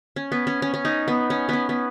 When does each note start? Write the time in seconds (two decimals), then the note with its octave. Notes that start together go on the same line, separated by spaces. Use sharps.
0.16 C#4
0.32 B3
0.47 C#4
0.62 C#4
0.74 C#4
0.85 D#4
1.08 B3
1.30 C#4
1.49 B3 C#4
1.69 B3